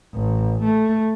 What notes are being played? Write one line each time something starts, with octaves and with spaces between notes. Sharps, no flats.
A1
A3